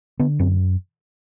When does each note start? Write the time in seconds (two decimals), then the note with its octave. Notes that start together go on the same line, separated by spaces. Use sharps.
0.19 D3 B3
0.39 F#2 C4